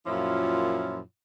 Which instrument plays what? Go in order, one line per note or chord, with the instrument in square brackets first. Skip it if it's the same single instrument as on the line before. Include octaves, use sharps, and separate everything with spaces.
[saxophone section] F#2 A#2 F3 C#4 E4 F4